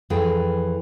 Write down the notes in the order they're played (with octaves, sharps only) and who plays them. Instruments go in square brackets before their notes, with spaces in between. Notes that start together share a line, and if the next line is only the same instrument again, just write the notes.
[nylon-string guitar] F2 E3 G#4 G5